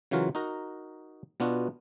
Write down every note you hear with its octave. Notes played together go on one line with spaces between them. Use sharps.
C#3 E3 F#3 F4 F#4 A#4
D#4 F#4 A#4 A#5
B2 B3 D4 F4 F#4